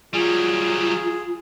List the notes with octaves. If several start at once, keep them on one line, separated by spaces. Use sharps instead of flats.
F#3 G3 F4 G#4